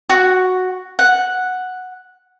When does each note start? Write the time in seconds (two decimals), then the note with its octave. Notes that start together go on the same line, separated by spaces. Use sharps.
0.09 F#4
0.99 F#5